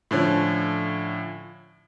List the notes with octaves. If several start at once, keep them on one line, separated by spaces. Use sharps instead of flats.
A2 D3 F3 C#4